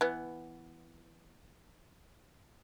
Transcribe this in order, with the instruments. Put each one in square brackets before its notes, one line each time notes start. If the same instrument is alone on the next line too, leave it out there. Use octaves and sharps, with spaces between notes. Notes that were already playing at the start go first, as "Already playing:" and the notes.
[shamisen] E3 B3